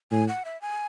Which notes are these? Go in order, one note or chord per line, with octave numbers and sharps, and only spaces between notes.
A2 G#5
F#5
E5
G#5